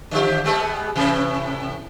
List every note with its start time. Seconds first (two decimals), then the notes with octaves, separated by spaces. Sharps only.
0.11 D3 F3 G4
0.44 G3 G#3 B3
0.95 A2 C3 E3